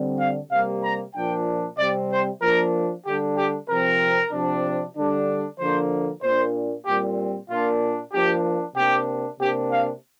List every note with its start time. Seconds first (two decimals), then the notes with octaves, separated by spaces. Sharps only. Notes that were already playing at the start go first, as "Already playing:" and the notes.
Already playing: D3 G3 C4
0.20 F5
0.52 C3 G3 A#3 F5
0.84 A#5
1.15 A#2 F3 D4 G5
1.78 C3 G3 C4 D5
2.11 C5
2.42 F3 A#3 D4 A#4
3.06 D3 G3 D4 G4
3.38 G4
3.69 C3 F3 C4 A#4
4.33 C3 F3 D4
4.96 D3 G3 D4
5.59 D3 F3 A#3 D4 C5
6.23 A#2 A#3 D4 C5
6.86 A#2 G3 C4 G4
7.50 A#2 A#3 D4 F4
8.13 F3 A#3 D4 G4
8.77 C3 A#3 D4 G4
9.40 C3 A#3 D4 G4
9.72 F5